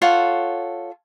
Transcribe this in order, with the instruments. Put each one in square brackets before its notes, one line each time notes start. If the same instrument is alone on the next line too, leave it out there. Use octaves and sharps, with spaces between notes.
[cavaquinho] F4 A4 C#5 F#5